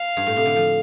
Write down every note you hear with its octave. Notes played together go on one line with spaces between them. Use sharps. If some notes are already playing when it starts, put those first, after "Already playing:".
Already playing: F5
G2
A2
C3
D3
F3